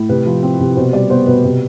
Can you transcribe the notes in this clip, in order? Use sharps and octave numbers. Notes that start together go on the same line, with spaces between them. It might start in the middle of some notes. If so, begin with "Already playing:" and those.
Already playing: A2
C3 B4
F3
C4
C3
B2 C5
G3 D5
B3 C5
B2 B4
C3